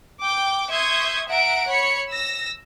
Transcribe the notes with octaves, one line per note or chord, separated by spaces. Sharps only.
G5 D6
E5 C6 C#6 D#6 G6 G#6
E5 F#5 A#5 D7
C#5 B5 C#7
E6 A#6